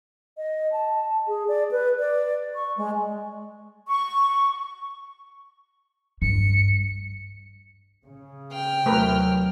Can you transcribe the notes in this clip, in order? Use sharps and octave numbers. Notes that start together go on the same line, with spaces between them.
D#5
A5
G#4
D5
B4
D5
C#6
G#3
C#6
G2 C#7
C#3
G5 F6
D#2 C3 F#3 A3 A#4 B4